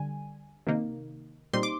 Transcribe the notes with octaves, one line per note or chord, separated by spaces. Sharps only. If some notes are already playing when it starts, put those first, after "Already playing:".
Already playing: D3 G3 G#5
C3 D#3 A#3 D#4
A#2 G3 C4 D#4 C6
D6